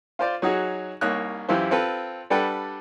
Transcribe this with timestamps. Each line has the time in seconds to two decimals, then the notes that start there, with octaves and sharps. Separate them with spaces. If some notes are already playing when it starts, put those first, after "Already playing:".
0.19 F4 C5 D5
0.42 F#3 D#4 F#4 G#4
1.01 C2 A#3 D#4 C#5 F#6
1.49 F#2 E3 E4 F4 G4 C5
1.71 C4 F4 A4 B4
2.30 G3 D4 A4 B4 F#5 G5